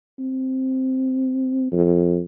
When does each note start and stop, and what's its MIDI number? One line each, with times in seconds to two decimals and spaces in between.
0.19 1.70 60
1.72 2.21 41